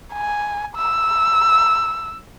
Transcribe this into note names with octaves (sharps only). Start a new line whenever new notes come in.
G#5
E6